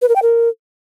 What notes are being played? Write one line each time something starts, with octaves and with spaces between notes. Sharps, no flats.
B4
A#4
G5
A#4